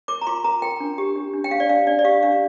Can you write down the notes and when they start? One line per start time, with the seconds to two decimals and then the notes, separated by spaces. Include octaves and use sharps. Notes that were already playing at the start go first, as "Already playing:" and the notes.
0.08 A#4 D6
0.21 A#5
0.27 F4 C6
0.44 A#4 A#5
0.62 A#4 G5
0.80 D4
0.98 G4
1.16 D4
1.33 D4
1.44 G5
1.51 G4 F5
1.60 D5
1.69 D4 F5
1.87 D4 D5
1.99 D5
2.04 G4 F5
2.23 D4 F5